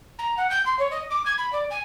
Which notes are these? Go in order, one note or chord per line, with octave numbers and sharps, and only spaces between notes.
A#5
F#5
G6
C6
C#5
D#5
D6
G#6
B5
D5
G#5